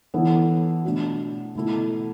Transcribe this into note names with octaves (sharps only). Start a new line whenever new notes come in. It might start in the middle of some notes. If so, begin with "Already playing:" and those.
E3 B3 E4 A4 C#5
B2 A3 D4 F#4
B2 A3 E4 A4